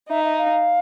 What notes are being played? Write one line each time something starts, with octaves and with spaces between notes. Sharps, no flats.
D#4 E5
E5
F5